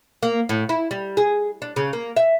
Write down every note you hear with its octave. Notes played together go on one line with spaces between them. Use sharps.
A#3
A2
E4
G3
G#4
D4
C#3
A#3
E5